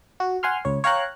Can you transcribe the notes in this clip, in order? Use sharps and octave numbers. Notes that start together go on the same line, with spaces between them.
F#4
F#5 G#5 C6 F6
C#2 C#5
C#5 F5 G5 A#5 F#6